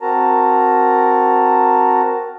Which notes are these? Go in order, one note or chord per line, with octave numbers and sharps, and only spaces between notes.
C4 F#4 A#4 A5 A#5